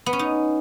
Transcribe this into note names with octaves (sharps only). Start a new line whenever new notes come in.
B3
C#4
D#4